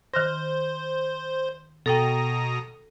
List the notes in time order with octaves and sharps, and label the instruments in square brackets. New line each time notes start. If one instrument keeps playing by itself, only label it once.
[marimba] D#3 F6 A#6 [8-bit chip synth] C5
[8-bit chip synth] B2 A#5 D#6 [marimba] A4 G5